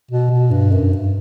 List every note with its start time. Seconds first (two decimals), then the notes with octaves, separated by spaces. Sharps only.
0.11 B2
0.31 B2
0.51 G2
0.72 F#2
0.93 G2